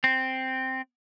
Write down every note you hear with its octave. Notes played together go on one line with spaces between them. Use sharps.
C4